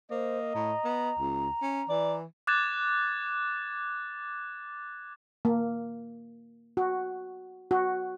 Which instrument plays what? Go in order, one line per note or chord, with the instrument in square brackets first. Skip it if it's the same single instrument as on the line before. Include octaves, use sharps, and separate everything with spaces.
[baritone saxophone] A#3 [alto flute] C5 [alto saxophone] D#5
[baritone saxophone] A2 [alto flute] A#5
[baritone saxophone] B3
C#2
C#4
[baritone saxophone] E3 [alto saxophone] D5
[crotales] D6 F#6 G#6 A6 E7
[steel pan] A#3
F#4
F#4